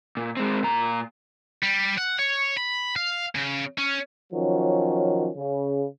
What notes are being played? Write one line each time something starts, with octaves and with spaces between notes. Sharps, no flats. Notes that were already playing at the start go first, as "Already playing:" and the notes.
A#2
G#3 C4
A#2 A#5
G3
F#5
C#5
B5
F5
C#3
C#4
D#3 F3 F#3 C#4
C#3